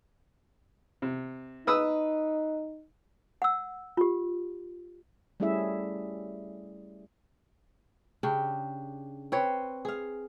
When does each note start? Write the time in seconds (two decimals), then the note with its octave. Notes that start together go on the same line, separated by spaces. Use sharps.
1.02 C3
1.67 D#4 B4 D#6 E6
3.42 F#5 E6
3.97 F4 G4
5.40 G3 A3 C#4 E4 G#4 E5
8.23 C#3 D4 G4
9.32 C4 B4 C#5
9.85 G#4 F5